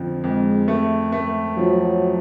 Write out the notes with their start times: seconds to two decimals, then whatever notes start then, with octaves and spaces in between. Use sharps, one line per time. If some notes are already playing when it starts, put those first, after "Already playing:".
Already playing: F2 D3 F3
0.24 F2 G#3
0.68 A3
1.12 A3
1.57 F3 F#3